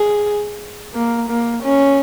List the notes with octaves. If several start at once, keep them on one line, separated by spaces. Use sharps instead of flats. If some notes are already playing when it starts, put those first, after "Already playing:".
Already playing: G#4
A#3
A#3
C#4